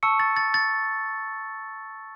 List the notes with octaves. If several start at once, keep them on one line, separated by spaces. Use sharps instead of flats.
A5 C#6 E6 C#7
A6
A6
A6